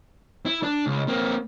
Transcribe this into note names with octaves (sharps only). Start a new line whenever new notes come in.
E4
D4
C#2
A#3 C4